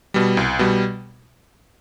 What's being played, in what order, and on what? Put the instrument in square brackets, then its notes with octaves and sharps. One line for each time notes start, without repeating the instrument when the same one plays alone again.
[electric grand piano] B2 G3
C2
B2 G3